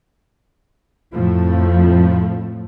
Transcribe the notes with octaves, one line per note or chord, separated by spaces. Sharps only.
F2 A2 F3 A3